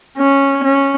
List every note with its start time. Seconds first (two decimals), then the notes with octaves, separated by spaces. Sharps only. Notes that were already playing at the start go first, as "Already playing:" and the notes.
0.18 C#4
0.64 C#4